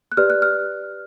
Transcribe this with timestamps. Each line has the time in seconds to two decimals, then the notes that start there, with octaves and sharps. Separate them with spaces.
0.12 F#6
0.17 G4 B4 D5 F6
0.30 F#6
0.42 F6